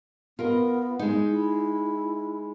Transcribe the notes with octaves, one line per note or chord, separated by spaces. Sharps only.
B3 F4 A#4 D#5
G#3 D#4
E4